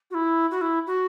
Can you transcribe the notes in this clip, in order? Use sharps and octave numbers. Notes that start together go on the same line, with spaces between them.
F#4
E4
F#4
E4
F#4